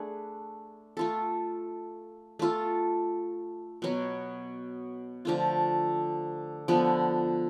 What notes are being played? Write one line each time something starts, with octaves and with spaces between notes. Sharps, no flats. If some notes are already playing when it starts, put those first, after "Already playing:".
Already playing: A3 D4 G#4 B4
A3 F4 A4
A3 F4 A4
B2 F#3 B3
D3 F3 A3 F4
D3 F3 B3